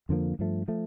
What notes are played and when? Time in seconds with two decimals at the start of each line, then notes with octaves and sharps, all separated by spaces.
0.09 F2 D3 F3 A#3
0.39 G2 F3 A3
0.68 F3 A3